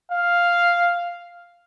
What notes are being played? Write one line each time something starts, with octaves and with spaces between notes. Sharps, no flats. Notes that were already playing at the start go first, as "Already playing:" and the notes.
F5